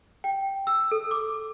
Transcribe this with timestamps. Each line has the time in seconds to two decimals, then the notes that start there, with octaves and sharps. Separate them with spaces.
0.24 G5
0.67 E6
0.92 A4
1.11 D6